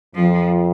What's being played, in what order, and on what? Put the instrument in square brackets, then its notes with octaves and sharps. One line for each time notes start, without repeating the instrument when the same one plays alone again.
[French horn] F2 [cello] F3